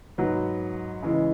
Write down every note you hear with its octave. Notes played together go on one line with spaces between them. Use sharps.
G#2 F#3 B3
C#3 E3 G#3